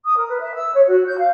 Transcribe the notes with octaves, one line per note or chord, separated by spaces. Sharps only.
D#6
A#4
B4
E5
E6
C#5
F#4
G6
F5